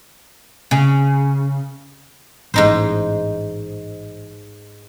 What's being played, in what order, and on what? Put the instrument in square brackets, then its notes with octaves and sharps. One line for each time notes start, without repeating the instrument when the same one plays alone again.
[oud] C#3
[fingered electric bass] A1 [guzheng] G#2 D#4 C5